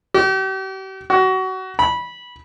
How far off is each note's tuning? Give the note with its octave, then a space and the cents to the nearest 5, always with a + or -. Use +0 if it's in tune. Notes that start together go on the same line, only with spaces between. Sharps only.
G4 -40
F#4 +25
B5 -15